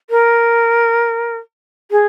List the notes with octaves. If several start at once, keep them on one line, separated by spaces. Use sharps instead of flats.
A#4
G#4